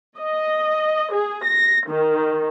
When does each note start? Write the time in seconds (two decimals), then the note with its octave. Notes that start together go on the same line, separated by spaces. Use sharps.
0.17 D#5
1.13 G#4
1.44 A#6
1.89 D#3